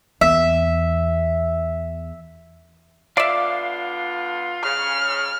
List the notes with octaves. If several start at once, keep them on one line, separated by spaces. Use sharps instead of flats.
E2 E5
D3 B3 F4 D5 E5 F5 D6
C#3 F6